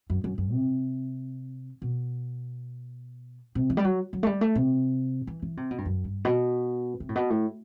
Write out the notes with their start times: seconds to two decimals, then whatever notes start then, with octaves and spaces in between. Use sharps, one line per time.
0.10 F#2
0.24 F#2
0.38 F#2
0.52 C3
1.82 B2
3.55 C3
3.70 E3
3.77 G3
3.84 F#3
4.13 F#3
4.23 A3
4.27 G3
4.41 A3
4.55 C3
5.27 E3
5.42 E3
5.57 C3
5.71 B2
5.78 G2
5.86 F#2
6.04 G2
6.25 B2
7.00 C3
7.09 A2
7.16 B2
7.30 A2